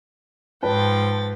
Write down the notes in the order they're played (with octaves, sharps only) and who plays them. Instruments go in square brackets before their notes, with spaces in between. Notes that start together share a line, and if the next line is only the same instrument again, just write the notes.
[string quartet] G#2 F3 A6 [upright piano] B4 A5 [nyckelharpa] G5